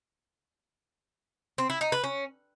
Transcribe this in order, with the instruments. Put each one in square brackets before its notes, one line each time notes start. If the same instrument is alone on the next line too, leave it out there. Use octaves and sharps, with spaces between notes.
[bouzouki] C4
E4
D#4
B4
C#4